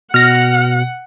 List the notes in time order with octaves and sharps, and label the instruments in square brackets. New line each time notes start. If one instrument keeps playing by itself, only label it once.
[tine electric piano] B2 [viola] F#5 [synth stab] F6 A#6